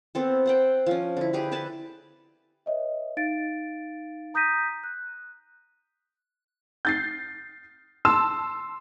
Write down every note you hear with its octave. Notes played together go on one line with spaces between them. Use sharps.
B3 C4 A4
C5 F#5 G5
F3 C#4
D3 E4
G4 G#4 B4
A4 B4 G#5 A5
B4 C#5 D#5 E5
D#4 F5 A6 D7
A#5 D#6 G6 A#6 B6 D#7
F#6
G6 A6 C7
A5 C6 E6 E7